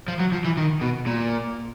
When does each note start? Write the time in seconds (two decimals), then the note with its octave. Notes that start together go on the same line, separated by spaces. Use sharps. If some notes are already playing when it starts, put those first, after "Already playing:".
0.08 F3
0.20 F#3
0.32 F3
0.45 E3
0.57 D#3
0.81 B2
1.07 A#2